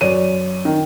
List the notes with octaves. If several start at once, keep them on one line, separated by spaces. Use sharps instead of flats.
F#2 C#5 D5 D#7
D#3